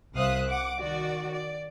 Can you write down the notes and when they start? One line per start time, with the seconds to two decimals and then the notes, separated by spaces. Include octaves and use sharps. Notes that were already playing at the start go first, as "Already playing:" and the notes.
0.16 C2 C5 E5 F5 D#6 F#6
0.49 F#5 D6
0.81 D#3 F#4 D5
1.31 D5